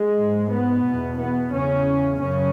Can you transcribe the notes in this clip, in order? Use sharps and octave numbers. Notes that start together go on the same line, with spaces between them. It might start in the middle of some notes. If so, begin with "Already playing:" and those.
Already playing: G#3
G#2
B3
E2 B2
B3
E2 C#3 C#4
F#2 C#3 C#4